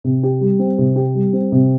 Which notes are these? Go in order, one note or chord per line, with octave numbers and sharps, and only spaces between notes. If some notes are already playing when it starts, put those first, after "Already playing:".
C3
G4
G3
C4
C3
G4
G3
C4
C3